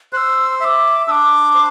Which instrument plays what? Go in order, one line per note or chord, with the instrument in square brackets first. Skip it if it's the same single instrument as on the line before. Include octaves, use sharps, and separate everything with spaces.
[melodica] C5 [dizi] E6 F#6
[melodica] E5 [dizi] D6 E6
[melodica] D4 [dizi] D6 E6
[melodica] C5